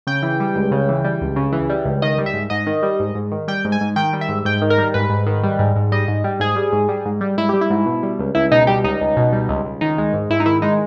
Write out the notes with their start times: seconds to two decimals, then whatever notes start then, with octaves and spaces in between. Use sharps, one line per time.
0.07 C#3 G5
0.23 E3
0.40 G3
0.56 C#2
0.71 C#3
0.89 E3
1.04 G3
1.21 C#2
1.36 C#3
1.52 E3
1.70 G3
1.85 C#2
2.02 D#3 D#5
2.18 G3
2.26 E5
2.34 G#2
2.50 G#2 D#5
2.66 D#3
2.83 G3
3.00 G#2
3.15 G#2
3.32 D#3
3.48 G3 G5
3.65 G#2
3.72 G#5
3.81 G#2
3.96 D#3 G5
4.13 G3
4.21 E5
4.29 G#2
4.45 G#2 G5
4.62 D#3
4.70 A#4
4.78 G3
4.94 G#2 B4
5.10 G#2
5.26 D#3
5.43 G3
5.59 G#2
5.76 G#2
5.92 G3 D#5
6.08 G#2
6.24 G3
6.40 G#2 G#4
6.56 G3
6.73 G#2
6.88 G3
7.05 G#2
7.21 G3
7.38 G#2 E4
7.49 G3 G4
7.61 E4
7.70 G#2
7.86 B2
8.03 G3
8.19 C#2
8.35 C#2 E4
8.52 B2 D#4
8.67 G3 G4
8.84 C#2 D#4
9.01 C#2
9.17 B2
9.33 G3
9.49 C#2
9.65 C#2
9.81 D#3 D#4
9.98 G#3
10.13 G#2
10.30 G#2 E4
10.40 D#4
10.46 D#3 E4
10.62 G#3 D#4